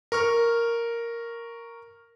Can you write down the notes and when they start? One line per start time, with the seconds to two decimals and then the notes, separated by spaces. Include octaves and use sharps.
0.12 A#4 C#6 F6